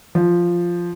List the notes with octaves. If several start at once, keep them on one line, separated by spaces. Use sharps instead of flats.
F3